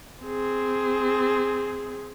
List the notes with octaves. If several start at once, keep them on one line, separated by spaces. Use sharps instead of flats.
C4 G#4